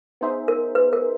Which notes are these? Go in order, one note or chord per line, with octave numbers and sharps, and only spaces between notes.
B3 D#4 G#4 C5 E5
A#4
B4
A#4